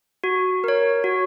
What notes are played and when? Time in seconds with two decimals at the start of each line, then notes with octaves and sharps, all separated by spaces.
0.24 F#4
0.64 A#4 C#5
1.04 F#4